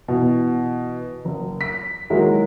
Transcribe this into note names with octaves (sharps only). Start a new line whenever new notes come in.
B2 E3
F#1
B6
D#3 F#3 G#3 A#3 E4